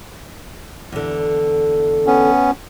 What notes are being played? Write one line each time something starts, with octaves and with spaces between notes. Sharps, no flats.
E2 D3
B3 C#4